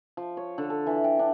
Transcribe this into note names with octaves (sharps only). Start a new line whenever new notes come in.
F3
C#5
D3
A4
E3
G5
D4